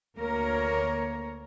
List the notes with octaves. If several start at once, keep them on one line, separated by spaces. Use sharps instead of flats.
D2 A#3 A#4 C#5